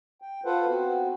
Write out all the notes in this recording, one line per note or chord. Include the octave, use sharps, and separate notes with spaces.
G5
F4 A4 B4 C5 F#5
B3 C4 F#4